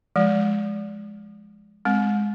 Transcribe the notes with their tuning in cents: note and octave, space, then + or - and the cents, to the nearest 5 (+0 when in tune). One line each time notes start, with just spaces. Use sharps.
F3 +0 G#3 +0
G#3 +0 C4 +0